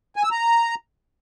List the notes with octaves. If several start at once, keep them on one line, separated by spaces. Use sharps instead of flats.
G#5
E6
A#5